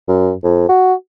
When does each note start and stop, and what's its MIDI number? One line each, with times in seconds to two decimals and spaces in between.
0.08 0.32 42
0.43 0.67 41
0.69 0.94 66